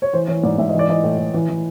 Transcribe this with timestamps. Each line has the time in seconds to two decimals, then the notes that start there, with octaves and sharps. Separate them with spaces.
0.02 C#5
0.13 E3 C5
0.28 E3 C#5
0.44 G#2 D5
0.59 G#2 E5
0.69 D#5
0.74 E3
0.79 D5
0.89 E3 D#5
1.04 A2
1.19 A2
1.34 E3
1.49 E3